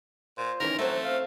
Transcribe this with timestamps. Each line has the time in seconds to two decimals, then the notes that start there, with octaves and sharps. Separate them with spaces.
0.38 A#2 C5
0.60 D#3 E3 C#4 A#4
0.79 F#3 A3 C4 C5
1.04 F5